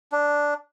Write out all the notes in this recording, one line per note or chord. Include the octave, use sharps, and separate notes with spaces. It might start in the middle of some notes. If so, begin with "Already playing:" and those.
D4